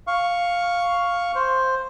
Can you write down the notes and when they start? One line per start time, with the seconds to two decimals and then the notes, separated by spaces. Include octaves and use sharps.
0.07 F5 C#6
1.35 C5